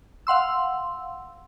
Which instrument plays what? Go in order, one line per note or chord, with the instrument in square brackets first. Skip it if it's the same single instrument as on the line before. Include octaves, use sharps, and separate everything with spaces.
[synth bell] F5 F#5 C6 E6